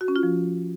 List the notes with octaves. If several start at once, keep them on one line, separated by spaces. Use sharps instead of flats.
F#4
C#4
F4
F3